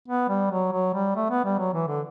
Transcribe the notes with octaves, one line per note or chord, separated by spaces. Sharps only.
B3
G3
F#3
F#3
G3
A3
B3
G3
F#3
E3
D3